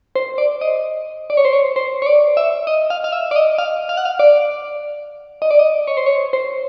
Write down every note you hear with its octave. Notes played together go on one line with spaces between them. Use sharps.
C5
D5
D#5
D5
C#5
C5
C#5
C5
C#5
D5
E5
D#5
F5
F5
E5
D5
D#5
F5
F5
F#5
F5
D5
D#5
D5
D#5
C#5
C5
C#5
C5